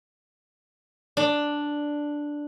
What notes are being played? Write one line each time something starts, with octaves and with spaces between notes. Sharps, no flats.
D4